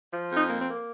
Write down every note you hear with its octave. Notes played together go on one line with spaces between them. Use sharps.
F3
F2
D#4
A#3
C4
A#3